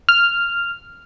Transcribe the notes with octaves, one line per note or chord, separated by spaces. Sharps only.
F6